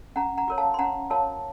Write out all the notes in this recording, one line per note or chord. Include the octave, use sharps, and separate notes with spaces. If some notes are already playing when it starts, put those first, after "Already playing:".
C#4 F#5 A#5
F#5 A#5
F#4 A#4 C#5
F5 A5
C6
C#4 F#5 A#5
F#4 A#4 C#5 F5 A5